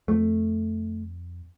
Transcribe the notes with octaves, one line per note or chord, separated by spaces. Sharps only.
F2 A3